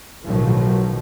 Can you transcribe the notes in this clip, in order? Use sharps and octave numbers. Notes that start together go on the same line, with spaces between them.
B1 A2 D#3 F3 F#3